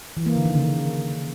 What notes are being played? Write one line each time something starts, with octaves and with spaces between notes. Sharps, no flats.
E3
A#3
D3
D#3
C#3